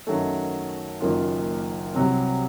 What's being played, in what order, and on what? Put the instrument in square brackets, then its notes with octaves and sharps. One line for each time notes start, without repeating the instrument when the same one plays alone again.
[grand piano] F#2 D#3 F#3 A3
F#1 F#2 D#3 A#3 F4
C2 C3 F#3 C4